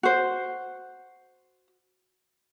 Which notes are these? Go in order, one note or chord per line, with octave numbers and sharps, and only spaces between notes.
F#4 C5